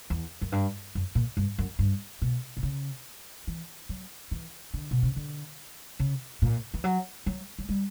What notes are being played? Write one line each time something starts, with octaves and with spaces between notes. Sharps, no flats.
E2
F#2
G2
F#2
A#2
G2
F#2
G2
B2
B2
C#3
E3
F#3
E3
D3
B2
C#3
D3
C#3
A#2
E3
F#3
F#3
F#3
G3